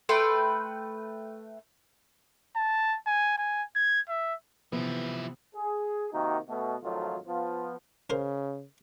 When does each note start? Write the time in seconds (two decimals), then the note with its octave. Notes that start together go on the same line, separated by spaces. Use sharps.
0.09 A3 B4 G5 C6
2.56 A5
3.07 G#5
3.38 G#5
3.76 G#6
4.09 E5
4.72 C3 E3 F3 B3 E4
5.55 G#4
6.13 C3 D#3 A#3 D#4 F#4
6.48 B2 A3
6.83 G#1 F3 F#3 A3 D#4 F4
7.27 F3 B3 F4
8.10 C#3 A#4 C5